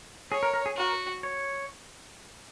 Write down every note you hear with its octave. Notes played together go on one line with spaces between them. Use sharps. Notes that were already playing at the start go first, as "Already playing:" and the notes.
G#4 C#5
A#4
A#4
G#4
F#4 A#4
C#5